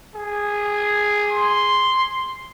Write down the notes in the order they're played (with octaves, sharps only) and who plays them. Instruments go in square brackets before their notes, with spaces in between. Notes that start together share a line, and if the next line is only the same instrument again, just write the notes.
[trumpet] G#4
[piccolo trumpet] C6